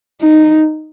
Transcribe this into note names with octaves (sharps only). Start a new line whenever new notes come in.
D#4